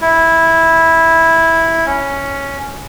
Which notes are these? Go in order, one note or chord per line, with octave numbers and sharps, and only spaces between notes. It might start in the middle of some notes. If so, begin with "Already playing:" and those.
E4
C#4